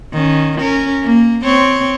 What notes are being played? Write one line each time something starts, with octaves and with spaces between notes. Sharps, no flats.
D#3 C#4
C#4 A#4
A#3
C4 C#5